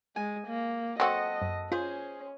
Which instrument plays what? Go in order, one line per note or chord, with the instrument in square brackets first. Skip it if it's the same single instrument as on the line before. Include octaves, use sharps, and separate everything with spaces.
[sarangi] G#3 [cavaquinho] G#5
[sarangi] A#3
[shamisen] F#3 C4 F#4 [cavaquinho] A4 F#5 [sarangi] D#5
[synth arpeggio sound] F#2
[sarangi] C#4 [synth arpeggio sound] F4 [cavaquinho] G#4 C5